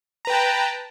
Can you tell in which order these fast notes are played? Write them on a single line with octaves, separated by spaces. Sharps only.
A#5 B4 G5 A5